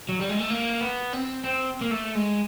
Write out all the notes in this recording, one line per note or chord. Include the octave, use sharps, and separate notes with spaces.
F#3
G3
G#3
A3
A#3
B3
C4
C4
A#3
A3
G#3